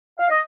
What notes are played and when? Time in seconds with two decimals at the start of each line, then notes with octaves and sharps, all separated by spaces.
0.20 F5
0.30 D#5